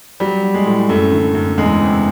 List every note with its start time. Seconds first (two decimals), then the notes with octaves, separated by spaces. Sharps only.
0.20 F#3 G3
0.43 F#3
0.54 G#3
0.66 A2
0.89 F#2 A3
1.12 D3
1.35 F#2
1.58 E2 G#3
1.81 C3